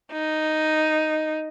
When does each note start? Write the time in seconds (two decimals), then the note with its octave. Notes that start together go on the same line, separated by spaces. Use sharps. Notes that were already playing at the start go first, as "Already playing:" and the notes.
0.12 D#4